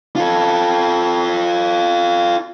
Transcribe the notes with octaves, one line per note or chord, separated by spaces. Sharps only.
F4 A4